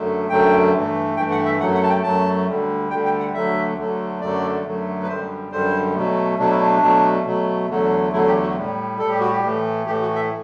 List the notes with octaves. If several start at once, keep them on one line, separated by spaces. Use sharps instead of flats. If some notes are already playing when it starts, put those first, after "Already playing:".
Already playing: F#2 D3 F#3 A3
F#2 D3 F#3 A3 G5
G2 E3 A3
G2 E3 A3 G5
F#5
E5
F#2 F#3 A3 F#5
F#5
A5
G5
F#2 F#3 A3 A5
D2 D3 G3
D2 D3 G3 G5
G5
F#5
D2 D3 F#3 A3 E5
D2 D3 F#3 A3
F#2 D3 F#3 A3 D5
F#2 D3 F#3 A3
B4
F#2 D3 G3 C5
F#2 D3 G3 C5
B2 F#3 A3
B2 F#3 A3 D4
E4
D4
B2 F#3 A3
B2 F#3 A3
E2 D3 F#3 A3
E2 D3 F#3 A3 E4
G4
F#4
A2 G3
A2 G3 A4
G4
F#4
G4
A2 E3 A3
A2 E3 A3 G4
F#4
E5